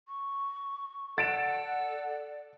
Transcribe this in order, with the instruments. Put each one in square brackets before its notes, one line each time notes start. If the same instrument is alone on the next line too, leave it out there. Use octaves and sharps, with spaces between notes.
[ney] C#6
[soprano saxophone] A4 [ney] D5 [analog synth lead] F#5 [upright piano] A6 D7 E7